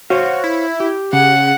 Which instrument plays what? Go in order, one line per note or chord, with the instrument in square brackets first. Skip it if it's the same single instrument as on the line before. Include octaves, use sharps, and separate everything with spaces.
[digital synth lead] F#4 [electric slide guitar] C5 C#5 F5
[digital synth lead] E4
[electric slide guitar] G4
[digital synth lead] C#3 [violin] F#5